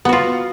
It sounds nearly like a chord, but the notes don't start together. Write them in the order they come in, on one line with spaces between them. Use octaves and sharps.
B3 F#4 F4